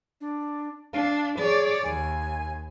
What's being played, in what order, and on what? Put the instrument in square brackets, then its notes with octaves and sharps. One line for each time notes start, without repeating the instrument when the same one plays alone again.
[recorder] D4
[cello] D4 [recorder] F5
[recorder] G#4 [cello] C#5 D5
[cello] D#2 [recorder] G#5